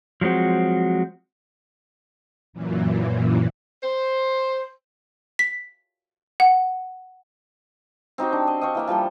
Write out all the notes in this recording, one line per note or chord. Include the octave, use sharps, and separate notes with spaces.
F3 F#3 G#3 C4 F#4
F#2 A#2 E3
C5
B6
F#5
C4 D#4 F#4 G4
D4
D#5
D#5 F5 G5 C#6
E3 A#3 E5
F3 G3 G5 A5